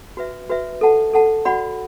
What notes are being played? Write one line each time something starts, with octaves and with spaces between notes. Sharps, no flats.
F#4 B4 E5
F#4 B4 E5
A4 F#5 A5
A4 F#5 A5
F#4 D5 F#5 B5